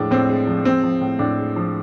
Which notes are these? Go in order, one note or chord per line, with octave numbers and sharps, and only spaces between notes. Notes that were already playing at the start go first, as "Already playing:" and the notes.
Already playing: A2 F3 G#3 D4
A2 C4
G#3
F3
G#3 C4
F3
A2
A2 D4
G#3
F3